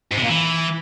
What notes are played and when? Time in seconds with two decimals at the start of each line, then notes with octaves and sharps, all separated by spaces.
0.11 G#2
0.17 C3
0.23 A#2
0.29 E3